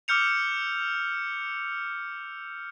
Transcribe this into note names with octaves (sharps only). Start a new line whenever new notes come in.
D6 E6 F6 G6 C#7 F7